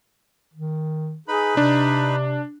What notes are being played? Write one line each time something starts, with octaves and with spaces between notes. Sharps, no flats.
D#3
D#4 G#4 B4 B5
C3 D4